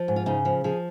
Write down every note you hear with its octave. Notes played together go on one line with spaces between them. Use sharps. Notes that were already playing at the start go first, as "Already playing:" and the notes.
Already playing: F3
G#2
F4
C#3 D#4
F3
F3 G#4